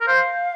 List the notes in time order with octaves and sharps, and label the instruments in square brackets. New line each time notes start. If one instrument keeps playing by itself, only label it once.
[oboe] A#4
[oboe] C5 [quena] F5